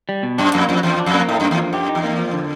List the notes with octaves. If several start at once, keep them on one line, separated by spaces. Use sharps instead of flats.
G3
B2
F#2 D4
F2 A#3
F2 F3
E2 F3
D4
F2
A#3
A2 D#4
F#2
A#3
E2
F3
F#2 G4
D#4
E2
A#3
F3
D3